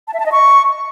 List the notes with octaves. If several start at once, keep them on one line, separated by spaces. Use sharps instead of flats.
A5
E5
A5
D#5
C#6